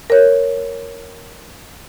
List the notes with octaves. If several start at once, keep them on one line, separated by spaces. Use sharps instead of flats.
A#4 C#5